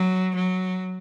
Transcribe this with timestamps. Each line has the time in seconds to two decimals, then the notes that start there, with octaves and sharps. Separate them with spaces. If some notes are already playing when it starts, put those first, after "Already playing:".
Already playing: F#3
0.35 F#3